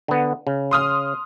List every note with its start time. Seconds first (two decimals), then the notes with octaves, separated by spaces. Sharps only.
0.08 D3 B3
0.47 C#3
0.71 C6 D#6 F6